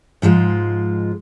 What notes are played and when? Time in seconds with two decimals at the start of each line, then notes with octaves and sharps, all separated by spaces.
0.22 G#2 F3 G#3 F4